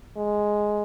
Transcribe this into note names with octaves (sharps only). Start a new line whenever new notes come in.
G#3